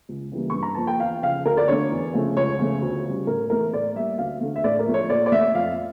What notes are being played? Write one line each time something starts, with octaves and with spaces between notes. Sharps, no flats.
C#2
C#3 E3 G3 A#3
G2 C#6
A#5
F3 A#3 A5
G5
E2 F5
C#3 F3 F5
D2 A#4
D5
D3 A3 C#5
E2
C#3 F3 A3
C#2 C#5
C#3 F3 A3
D2
C#3 G3
A2 A#4
E3 A3 A#4
A2 D5
G3 A#3 E5
D2 F5
D3 A3
E5
A2 D5
A#4
F3 A3
C#5
A#2 D5
D5
A3 E5
F2 F5